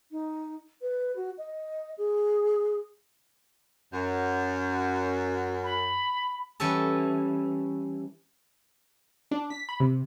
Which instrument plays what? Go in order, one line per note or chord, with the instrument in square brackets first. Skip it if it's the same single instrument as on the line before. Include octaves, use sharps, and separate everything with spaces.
[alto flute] D#4
B4
F#4
D#5
G#4
[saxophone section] F#2
[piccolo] B5
[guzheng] E3 G3 C#4 A4
[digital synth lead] D4
B6
B5
C3